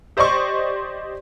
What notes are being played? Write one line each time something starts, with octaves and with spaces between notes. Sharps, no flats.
G4 C5 D5 D#5 C6 C#6